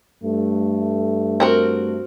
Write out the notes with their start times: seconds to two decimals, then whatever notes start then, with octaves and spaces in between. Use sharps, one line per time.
0.23 G2 A3
1.40 C4 F#4 A#4